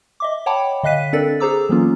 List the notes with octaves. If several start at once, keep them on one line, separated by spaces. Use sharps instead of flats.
D#5 E5 D6
C#5 F#5 G5 A5 B5 D6
D3 D#5 F5 F#6 B6 D#7
C4 D4 A4 A#4 D5 A6
G#4 A4 C5 A#5 D6 E6
E3 F#3 A#3 B3 C#4 F4